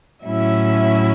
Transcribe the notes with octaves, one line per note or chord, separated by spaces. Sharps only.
A2 F#3 C#4 E4 E5